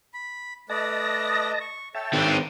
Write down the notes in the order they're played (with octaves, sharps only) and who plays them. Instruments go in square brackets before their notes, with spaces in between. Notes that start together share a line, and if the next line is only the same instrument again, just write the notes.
[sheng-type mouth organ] B5
[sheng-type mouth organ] A3 B4 D5 [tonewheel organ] D#5 A5 A#6
[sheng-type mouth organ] C#6
[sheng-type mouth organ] A4 C#5 [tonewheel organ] E5 G5 A5
[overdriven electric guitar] D#3 C4 [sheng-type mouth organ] D4 B4 C#5